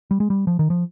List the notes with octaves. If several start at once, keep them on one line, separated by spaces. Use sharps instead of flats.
G3
G#3
G3
F3
D#3
F3